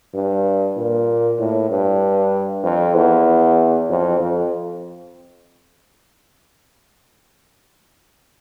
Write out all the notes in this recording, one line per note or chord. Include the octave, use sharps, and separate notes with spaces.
G2
A#2
A2
G2
F2
E2
F2
F2